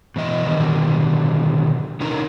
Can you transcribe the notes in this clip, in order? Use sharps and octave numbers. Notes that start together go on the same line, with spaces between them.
B2 E3 D#5
B2 D3 D#3 G3
D3 C#4 D#4 A#4